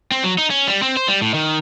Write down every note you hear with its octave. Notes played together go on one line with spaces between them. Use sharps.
C4
F#3
D#4
C#4
G3
C4
C5
G3
A2
D#3